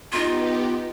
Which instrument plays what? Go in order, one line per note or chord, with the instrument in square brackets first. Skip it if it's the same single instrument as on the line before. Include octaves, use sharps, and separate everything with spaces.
[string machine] B3 G4 [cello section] D#4 [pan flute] F4